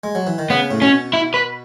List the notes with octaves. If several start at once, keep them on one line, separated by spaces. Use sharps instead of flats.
G#3
F#3
E3
D#3
C#3 B3
A2
B2 C#4
E4
B4